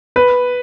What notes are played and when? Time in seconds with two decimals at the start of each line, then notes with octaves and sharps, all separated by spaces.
0.16 B4